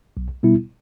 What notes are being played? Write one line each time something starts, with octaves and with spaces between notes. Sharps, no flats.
B1
B2 G3 B3 E4